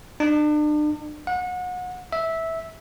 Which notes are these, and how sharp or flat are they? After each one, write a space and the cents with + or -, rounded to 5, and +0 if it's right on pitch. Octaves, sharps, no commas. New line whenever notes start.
D4 +40
F#5 -30
E5 -10